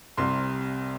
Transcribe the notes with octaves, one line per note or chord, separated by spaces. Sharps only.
C2 C3 G3 C6